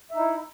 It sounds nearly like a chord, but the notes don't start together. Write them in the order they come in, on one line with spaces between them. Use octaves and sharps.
E5 D#4 E4